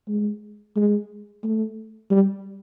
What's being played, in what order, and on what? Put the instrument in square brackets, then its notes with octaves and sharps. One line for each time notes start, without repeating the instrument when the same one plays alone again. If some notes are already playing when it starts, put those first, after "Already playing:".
[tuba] G#3
G#3
A3
G3